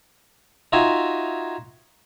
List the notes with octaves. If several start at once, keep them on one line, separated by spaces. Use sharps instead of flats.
D#4 F4 F#4 E5 F5 G#5